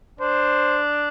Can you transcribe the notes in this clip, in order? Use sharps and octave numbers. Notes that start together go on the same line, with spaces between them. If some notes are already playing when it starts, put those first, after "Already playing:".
D4 C5